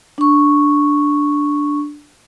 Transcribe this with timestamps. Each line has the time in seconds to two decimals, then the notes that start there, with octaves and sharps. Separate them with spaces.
0.18 D4 C#6